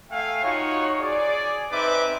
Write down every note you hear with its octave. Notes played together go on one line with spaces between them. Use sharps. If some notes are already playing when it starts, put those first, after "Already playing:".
A3 E5 F5 G5 G#5
D#4 F4 F#4 C#5
G#4 D5
C4 D#4 B4 E5 D6